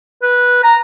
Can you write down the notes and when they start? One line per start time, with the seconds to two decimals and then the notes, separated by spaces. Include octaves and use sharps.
0.23 B4
0.64 A#5